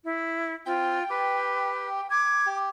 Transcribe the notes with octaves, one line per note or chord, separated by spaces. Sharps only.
E4
C4 F4 G5
G4 B4
D6 G#6
G4